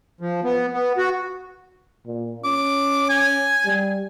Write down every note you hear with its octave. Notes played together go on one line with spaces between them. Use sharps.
F3
B3
B3
F#4
A#2
C#4 D6
G#5
G3